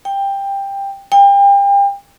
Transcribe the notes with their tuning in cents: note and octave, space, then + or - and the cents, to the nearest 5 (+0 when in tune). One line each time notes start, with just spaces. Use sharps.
G5 +15
G5 +35